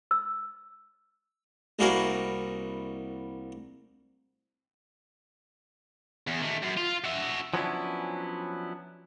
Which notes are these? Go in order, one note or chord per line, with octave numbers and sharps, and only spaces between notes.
E6
C2 G3 A#3 F#4 G#4 A#4
E2
D#3 A3
F#2
F4
F#4 E5
F3 F#3 B3 C#4 D4 E4